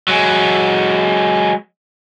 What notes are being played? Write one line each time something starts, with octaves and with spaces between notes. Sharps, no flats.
F#3 G#3